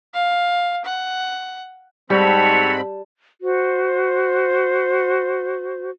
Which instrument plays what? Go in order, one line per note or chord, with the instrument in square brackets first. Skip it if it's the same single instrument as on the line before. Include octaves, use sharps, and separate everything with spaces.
[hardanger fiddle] F5
F#5
[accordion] G#2 C4 B5 [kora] G3 [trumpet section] F#4 A4 C#5 [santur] A5
[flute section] F#4 C5